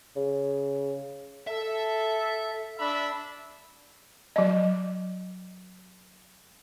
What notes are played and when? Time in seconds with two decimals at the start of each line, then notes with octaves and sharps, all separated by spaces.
0.16 C#3
1.47 A4 E5
2.78 D4 E5 B5
4.36 F#3 D#5